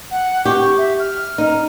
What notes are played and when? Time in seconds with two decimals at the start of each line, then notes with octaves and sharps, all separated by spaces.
0.11 F#5
0.45 G4 C#6
0.78 E5
0.99 F6
1.38 D#4